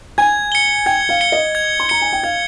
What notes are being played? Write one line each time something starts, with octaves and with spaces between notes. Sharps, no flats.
G#5 G#6
C#7 G7
G5 G#6
F5
C#7 G7
D#5
G#6
C6
A#5 C#7 G7
G#5
G5
F5 G#6